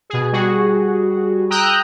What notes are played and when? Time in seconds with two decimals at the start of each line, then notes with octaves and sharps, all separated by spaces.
0.10 B2 G#4
0.32 G3 F#4 G#4
1.50 G5 A#5 D#6 E6 F#6 G6